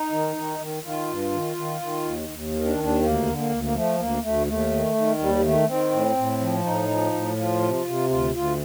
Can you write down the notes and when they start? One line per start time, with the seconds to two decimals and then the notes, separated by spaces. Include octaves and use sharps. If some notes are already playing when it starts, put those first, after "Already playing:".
Already playing: D#4
0.11 D#3
0.36 D#3
0.59 D#3
0.83 D#3 F4
1.08 G2
1.32 D#3
1.56 D#3
1.81 D#3
2.05 D#2
2.29 D#2
2.53 D#3
2.65 D4
2.77 D#2
2.83 D4
3.02 D2 A#3
3.26 D3
3.37 A#3
3.50 D2
3.63 A#3
3.74 F3 A3
3.98 D2 A#3
4.22 D2 A3
4.47 D#2 A3
4.71 D#3
4.95 D#3
5.19 D#2 G3
5.43 D#3 A3
5.68 D#3 C4
5.91 A2
6.17 A2
6.40 F3
6.64 A2 D#4
6.88 F3
7.13 A2
7.37 F3 F4
7.61 C3
7.73 F4
7.85 C3
8.09 D2 F4
8.33 D2 F4